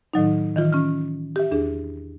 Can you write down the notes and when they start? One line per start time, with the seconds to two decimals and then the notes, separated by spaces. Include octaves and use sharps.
0.14 A2 D#3 F#3 D#4
0.56 D#3 E3 F4
0.72 C#4 F6
1.36 G4 E5
1.51 E2 D4 G#4